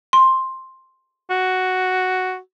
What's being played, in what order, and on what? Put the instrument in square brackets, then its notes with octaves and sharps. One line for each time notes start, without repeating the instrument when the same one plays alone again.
[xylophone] C6
[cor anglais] F#4